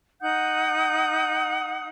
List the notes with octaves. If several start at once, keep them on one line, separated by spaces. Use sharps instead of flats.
D#4 F#5 D#6 G6